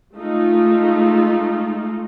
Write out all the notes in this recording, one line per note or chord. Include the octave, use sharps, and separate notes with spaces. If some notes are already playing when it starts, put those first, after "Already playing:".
G#3 A3 D#4 F4